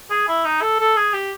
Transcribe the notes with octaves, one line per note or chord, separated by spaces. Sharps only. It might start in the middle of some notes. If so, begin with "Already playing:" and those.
G#4
E4
D#4
A4
A4
G#4
G4